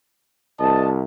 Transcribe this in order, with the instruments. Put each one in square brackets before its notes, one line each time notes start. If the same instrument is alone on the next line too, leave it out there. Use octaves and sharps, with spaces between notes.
[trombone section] C2 [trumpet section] D#5 A5